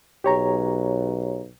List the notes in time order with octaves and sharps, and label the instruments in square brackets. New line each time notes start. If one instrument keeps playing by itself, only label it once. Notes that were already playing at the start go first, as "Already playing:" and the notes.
[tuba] B1 [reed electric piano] G4 C#5 A#5